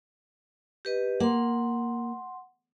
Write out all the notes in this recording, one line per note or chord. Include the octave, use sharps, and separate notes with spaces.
G4 B4 D#5
A#3 F#5 C6